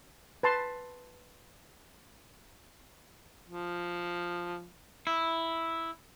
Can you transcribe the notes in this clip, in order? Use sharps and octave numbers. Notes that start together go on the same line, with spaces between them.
B4 A5 C6
F3
E4